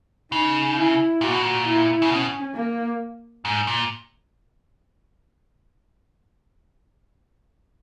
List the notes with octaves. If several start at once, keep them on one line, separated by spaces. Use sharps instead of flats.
C#3 D#4
E4
A#2 F#4
B2
A#2
E4
C#3
B2 C#4
A#3
G#2
A#2